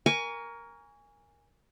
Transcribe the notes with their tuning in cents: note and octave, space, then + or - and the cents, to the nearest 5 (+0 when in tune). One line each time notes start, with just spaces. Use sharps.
A#4 +5 G#5 -10 C#6 +30